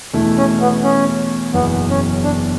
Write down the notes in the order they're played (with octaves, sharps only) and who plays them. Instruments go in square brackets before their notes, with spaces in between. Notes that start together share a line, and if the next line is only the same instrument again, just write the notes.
[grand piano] E2 B2 A3 E4
[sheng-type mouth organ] C#4
B3
C#4
[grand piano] F#1 E2 B2 [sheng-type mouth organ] B3
[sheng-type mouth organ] C#4
D4